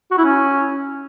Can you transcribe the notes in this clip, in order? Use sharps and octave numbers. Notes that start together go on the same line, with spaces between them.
F#4
E4
C#4